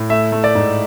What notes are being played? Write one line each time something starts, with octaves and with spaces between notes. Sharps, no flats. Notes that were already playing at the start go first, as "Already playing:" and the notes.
Already playing: A2
A3 E5
A3
D5
G#2